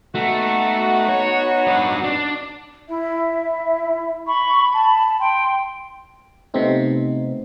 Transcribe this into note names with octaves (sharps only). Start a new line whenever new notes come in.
A3 B3 D#4 F#4
C#5
D4 B4
D4
E4 E5
E4
B5 C#6
A5
G5 C6
C3 A3 B3 C4 D#4